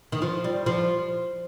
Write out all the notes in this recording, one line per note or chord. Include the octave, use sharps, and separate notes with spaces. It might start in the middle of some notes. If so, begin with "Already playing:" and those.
D#3
F3
G3
F3